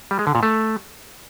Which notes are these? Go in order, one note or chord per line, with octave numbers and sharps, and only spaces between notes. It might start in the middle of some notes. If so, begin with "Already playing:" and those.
G3
G#3
D3
A#2
A3